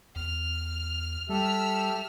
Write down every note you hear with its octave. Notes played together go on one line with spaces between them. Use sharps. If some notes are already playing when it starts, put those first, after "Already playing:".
E2 F6
G3 G4 A4 E5 E6 F6